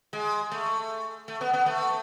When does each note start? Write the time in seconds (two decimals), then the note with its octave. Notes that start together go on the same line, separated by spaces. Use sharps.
0.13 G#3
0.51 A3
1.28 A3
1.41 B3
1.53 B3
1.66 A3